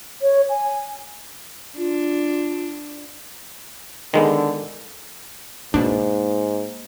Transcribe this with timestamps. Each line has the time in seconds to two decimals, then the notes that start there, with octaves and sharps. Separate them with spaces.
0.21 C#5
0.49 G#5
1.78 D4 F4
4.14 D3 D#3 G#3 B3
5.74 G#2 B2 A#3 D4